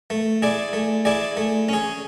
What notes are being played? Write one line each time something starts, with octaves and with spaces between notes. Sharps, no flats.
A3
E4 G#4 D5
A3
E4 G#4 D5
A3
C#4 G#4